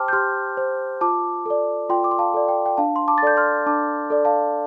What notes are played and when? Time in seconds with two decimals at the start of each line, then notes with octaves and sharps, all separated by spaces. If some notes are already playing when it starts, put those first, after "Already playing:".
Already playing: G4 C5 G5 A5 C6 D6 F6
0.08 G6
0.13 G4 C6 F6
0.57 C5
1.01 F4 A5 D6
1.46 A4 D5
1.90 F4 G5 C6
2.04 D6
2.11 C6
2.19 F5 A5
2.34 A4 D5
2.48 G5
2.66 G5
2.77 D4 F5 A5
2.96 C6
3.08 A5 D6
3.18 A6
3.22 A4 D5 G6
3.37 C6 F6
3.66 D4 A5 D6
4.10 A4 D5
4.25 F5 A5